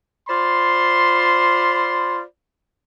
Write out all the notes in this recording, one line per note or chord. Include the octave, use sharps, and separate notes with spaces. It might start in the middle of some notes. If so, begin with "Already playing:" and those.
F4 C5 D5 B5 C6